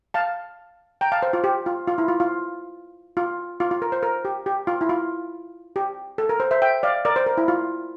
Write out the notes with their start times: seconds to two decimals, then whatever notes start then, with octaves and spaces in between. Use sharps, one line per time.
0.14 F5 A5
1.01 G5 A#5
1.12 F5 A5
1.23 C5
1.33 F4
1.44 G4
1.66 F4
1.87 F4
1.98 E4
2.08 F4
2.20 F4
3.17 F4
3.60 F4
3.71 F4
3.82 A#4
3.92 C5
4.03 A#4
4.25 G4
4.46 G4
4.67 F4
4.81 E4
4.89 F4
5.76 G4
6.18 A4
6.29 A#4
6.40 C5
6.51 C5 E5
6.62 E5 G5
6.83 D5 F5
7.05 A#4 D5
7.16 C5
7.27 A#4
7.38 E4
7.48 F4